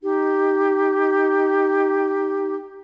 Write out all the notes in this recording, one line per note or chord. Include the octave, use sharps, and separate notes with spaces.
D#4 G4